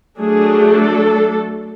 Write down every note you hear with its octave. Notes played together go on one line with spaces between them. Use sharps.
F#3 A3 D4 G#4
A4